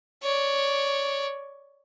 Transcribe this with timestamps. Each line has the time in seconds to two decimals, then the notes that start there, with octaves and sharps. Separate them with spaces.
0.23 C#5 D5